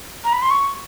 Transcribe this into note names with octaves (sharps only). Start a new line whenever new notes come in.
A#5
B5
C6
C#6